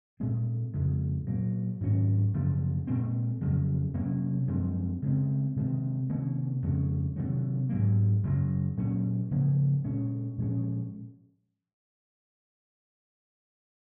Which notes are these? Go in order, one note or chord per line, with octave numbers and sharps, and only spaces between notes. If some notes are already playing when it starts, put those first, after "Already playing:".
A#2 G#3 C4
F2 C#3 G#3
A#2 F#3 A#3
G#2 D#3 F#3 C#4
F#2 C#3 F3 A#3
A#2 G#3 C4
F2 C#3 F#3
C3 F#3 A#3 C#4
F#2 F3 G#3 C4
C#3 G#3 C4
C3 D#3 G#3 C4
C3 D#3 A#3 C#4
F2 C#3 G#3 C#4
C3 D#3 F#3
G#2 F#3 A#3
F#2 C#3 F#3
A#2 F#3 A#3 C#4
C#3 F3 A#3
A#2 G#3 C#4
A#2 F3 G#3 C#4